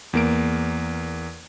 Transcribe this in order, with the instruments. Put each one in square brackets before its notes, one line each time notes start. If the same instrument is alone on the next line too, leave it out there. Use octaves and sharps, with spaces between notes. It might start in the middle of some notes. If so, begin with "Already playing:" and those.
[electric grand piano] E2 A#3 D7